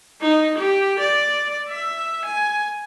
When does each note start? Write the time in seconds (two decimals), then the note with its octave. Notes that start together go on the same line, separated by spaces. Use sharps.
0.21 D#4
0.58 G4
0.99 D5
1.69 E5
2.25 G#5